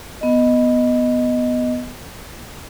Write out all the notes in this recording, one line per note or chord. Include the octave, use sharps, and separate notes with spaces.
B3 D#5